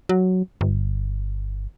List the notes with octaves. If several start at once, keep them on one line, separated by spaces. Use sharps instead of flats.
F#3
G1